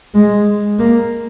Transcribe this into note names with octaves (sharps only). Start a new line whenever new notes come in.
G#3
A#3